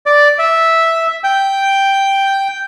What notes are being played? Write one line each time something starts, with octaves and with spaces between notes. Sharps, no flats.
D5
E5
G5